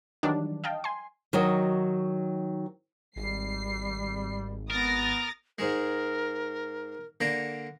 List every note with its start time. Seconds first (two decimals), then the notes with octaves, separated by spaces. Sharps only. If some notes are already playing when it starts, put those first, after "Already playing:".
0.23 D#3 E3 F#3 G3 D4
0.64 D#5 F5 G5 A5
0.84 G#5 C6
1.33 D#3 F#3 F#4 D#5
3.16 G#1 G3 C7
4.71 B3 A#4 D#6 A6 A#6
5.59 G#2 G#3 A#4
7.21 D3 A#3 A#5